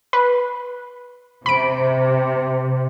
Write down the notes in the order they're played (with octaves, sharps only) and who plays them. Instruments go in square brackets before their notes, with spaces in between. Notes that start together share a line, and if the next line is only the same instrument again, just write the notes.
[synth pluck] B4
[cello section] C3 [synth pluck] B5 D7